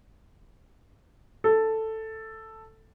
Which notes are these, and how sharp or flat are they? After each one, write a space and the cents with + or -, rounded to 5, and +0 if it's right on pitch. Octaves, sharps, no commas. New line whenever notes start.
A4 +5